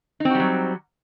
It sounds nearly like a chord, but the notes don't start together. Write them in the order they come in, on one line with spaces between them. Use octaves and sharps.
D#4 C4 F#4 G3 F#3